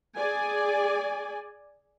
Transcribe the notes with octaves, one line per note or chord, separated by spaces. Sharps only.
G#4 D5 G#5